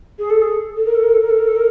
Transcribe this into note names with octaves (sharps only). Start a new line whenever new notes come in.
G#4
A4
G#4
A4
A#4
A4
A#4
A4
A#4
A4
A#4
A4
A#4